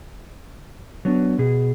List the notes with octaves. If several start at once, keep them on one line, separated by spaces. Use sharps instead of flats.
F#3 B3 D4
B2 G#4